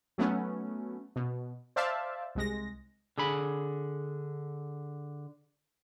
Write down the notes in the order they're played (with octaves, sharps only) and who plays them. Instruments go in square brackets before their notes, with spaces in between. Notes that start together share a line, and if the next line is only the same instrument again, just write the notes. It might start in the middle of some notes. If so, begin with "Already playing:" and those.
[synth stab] F#3 A3 B3 C#4
B2
C5 D5 E5 F5 A5
C2 G#3 A#6
[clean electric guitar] D3 G#4 B5